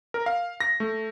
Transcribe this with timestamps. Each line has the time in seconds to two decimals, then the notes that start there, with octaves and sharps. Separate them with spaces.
0.14 A#4
0.26 F5
0.60 A#6
0.80 A3